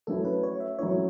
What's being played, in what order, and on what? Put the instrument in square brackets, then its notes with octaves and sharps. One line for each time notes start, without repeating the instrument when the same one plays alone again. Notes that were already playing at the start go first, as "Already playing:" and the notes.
[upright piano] F#3 A3 C#4 E4 [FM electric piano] A4
[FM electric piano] B4
C#5
E5
[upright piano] F#3 A3 C#4 E4 [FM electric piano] C#5